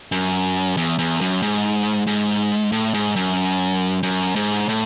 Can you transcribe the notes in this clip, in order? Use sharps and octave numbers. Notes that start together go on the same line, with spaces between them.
F#2
E2
E2
F#2
G#2
G#2
A2
G#2
F#2
F#2
G#2
A2